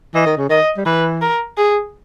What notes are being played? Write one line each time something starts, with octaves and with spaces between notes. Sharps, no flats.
E3 D#5
D#3
C#3
D#3 D#5
G3
E3 B4
A#4
G#4